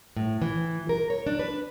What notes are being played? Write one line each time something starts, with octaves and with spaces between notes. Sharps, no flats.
A2
E3
A#4
C#5
D4
B4